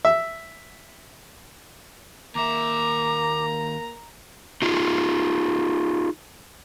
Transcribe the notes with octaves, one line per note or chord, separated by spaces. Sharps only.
E5
D#2 A#3 E5 A#5 D6
D#4 F4 G#4